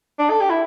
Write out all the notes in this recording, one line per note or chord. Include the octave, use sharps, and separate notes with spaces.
D4
A4
G4
E4